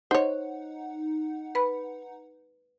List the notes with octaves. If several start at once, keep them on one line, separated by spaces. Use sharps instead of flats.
D#4 C5 C#5 F#5
B4 B5